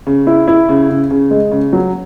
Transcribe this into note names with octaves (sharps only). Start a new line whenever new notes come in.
C#3
E4
E4
C#3
C#3
C#3
G#3
C#3
F#3